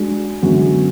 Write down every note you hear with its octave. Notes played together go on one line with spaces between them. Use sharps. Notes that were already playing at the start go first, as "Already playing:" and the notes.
Already playing: G#3 D4 F#4
F#2 D3 G#3 B3 F#4